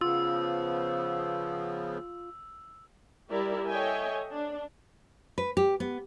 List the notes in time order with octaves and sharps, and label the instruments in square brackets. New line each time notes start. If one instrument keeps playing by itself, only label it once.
[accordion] C#3 F3 B3 [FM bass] F4 [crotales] E6
[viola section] G3 E4 G4 A#4 D5
A4 C#5 D#5 E5 G5 G#5
D4
[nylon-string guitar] B4
G4
B3